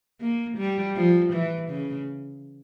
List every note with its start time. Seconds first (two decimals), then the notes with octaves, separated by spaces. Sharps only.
0.21 A#3
0.58 G3
0.96 F3
1.33 E3
1.69 C#3